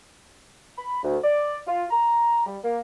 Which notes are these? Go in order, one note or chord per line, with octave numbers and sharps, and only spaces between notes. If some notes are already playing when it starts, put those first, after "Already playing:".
B5
D2
D5
F4
A#5
G3
A#3